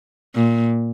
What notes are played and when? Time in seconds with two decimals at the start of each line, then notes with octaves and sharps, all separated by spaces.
0.35 A#2